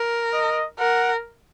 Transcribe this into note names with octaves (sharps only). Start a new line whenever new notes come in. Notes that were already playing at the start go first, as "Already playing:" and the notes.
Already playing: A#4
D#5
A#4 F#5